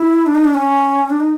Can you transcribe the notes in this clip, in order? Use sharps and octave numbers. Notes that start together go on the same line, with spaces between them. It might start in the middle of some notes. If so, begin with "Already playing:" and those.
Already playing: E4
D4
D#4
D4
C#4
D4
D#4